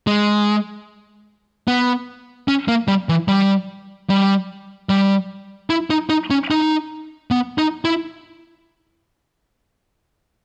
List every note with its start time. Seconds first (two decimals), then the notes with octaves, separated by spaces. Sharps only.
0.07 G#3
1.68 B3
2.48 C#4
2.68 A#3
2.88 G3
3.09 E3
3.28 G3
4.10 G3
4.89 G3
5.70 E4
5.90 D#4
6.10 D#4
6.30 C#4
6.51 D#4
7.31 B3
7.58 D#4
7.85 E4